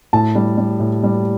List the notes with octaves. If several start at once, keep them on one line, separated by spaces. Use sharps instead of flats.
A2 A5
G3
G3
A2
G3